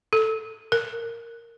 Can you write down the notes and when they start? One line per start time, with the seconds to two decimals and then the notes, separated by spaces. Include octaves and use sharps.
0.13 A4
0.72 A#4